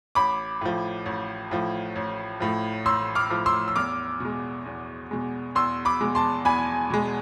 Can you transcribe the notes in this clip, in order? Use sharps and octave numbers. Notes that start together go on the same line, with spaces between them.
A1 B5 D6
A2 F3
A1
A2 F3
A1
A2 F3
A1 C6 E6
D6 F6
A2 F3
C6 E6
E6
E2 D6 F6
B2 G#3
E2
B2 G#3
E2 C6 E6
B5 D6
B2 G#3
A5 C6
E2 G#5 B5
B2 G#3